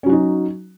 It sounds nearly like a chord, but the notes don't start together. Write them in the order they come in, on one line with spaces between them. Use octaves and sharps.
C#4 F#3 F#4 D#4